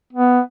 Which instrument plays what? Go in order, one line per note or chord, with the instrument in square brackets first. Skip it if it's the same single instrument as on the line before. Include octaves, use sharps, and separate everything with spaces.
[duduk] B3